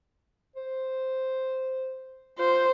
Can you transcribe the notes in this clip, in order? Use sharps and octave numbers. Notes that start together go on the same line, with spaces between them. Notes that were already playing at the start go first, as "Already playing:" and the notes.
C5
F4 C5